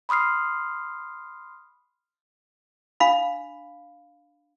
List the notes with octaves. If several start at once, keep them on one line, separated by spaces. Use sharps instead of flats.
B5 C6 D#6 F6 C7
D4 F5 B5